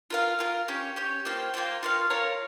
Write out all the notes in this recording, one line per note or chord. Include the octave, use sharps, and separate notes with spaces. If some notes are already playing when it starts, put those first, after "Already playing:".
F4 A#4 F5
F4 A#4 F5
C#4 G4 C#5
C#4 G4 C#5
A#3 F4 C5 G5
A#3 F4 C5 G5
F4 A#4 C#5 F5
F4 A#4 C#5 F5